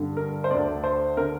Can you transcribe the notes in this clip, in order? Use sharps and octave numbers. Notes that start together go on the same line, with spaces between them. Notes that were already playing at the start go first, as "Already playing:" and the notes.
Already playing: G2 D3
A#4
C5
D2 D3 D5
C5
D3 A#4